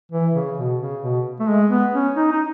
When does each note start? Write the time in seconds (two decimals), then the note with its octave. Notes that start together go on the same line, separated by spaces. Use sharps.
0.12 E3
0.34 C#3
0.58 B2
0.80 C#3
1.02 B2
1.40 A3
1.48 G#3
1.70 B3
1.94 C#4
2.16 D#4
2.32 D#4